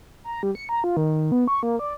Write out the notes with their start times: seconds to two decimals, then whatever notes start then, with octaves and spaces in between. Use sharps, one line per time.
0.24 A#5
0.43 G3
0.55 C#7
0.69 A#5
0.84 F4
0.97 D#3
1.32 B3
1.48 C#6
1.63 A#3
1.79 D5